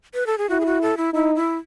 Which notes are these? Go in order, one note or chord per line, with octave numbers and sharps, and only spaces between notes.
B4
A4
G#4
E4 F#4
G#4
F#4
A4
E4
D#4 E4
E4